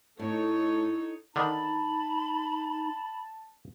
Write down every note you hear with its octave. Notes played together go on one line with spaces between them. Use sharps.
A2 D#4 A4 C#5
D3 D#3 D4 D#4 A5 B5